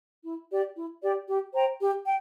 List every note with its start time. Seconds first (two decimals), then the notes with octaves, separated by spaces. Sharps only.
0.24 E4
0.51 G4 D5
0.76 E4
1.02 G4 D5
1.28 G4
1.54 C5 G5 A#5
1.80 G4
2.05 G5